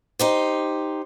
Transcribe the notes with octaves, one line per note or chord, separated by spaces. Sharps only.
D#4 G4 C5